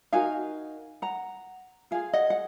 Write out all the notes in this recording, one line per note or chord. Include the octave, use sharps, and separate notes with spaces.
D#4 F#4 A#4 F5 G#5
F#5 A#5
F4 G#4 F5 G#5
D#5 F#5
F#5